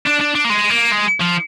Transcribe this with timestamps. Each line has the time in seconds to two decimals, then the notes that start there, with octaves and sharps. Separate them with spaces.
0.06 D4
0.20 D4
0.35 D4
0.45 A#3
0.50 G#3
0.70 A#3
0.92 G#3
1.21 F3